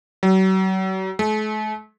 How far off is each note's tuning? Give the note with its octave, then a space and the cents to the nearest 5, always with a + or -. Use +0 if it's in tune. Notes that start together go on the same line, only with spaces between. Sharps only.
F#3 +40
A3 -45